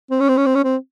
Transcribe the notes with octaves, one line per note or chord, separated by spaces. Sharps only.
C4
C#4
C4
C#4
C4
C#4
C4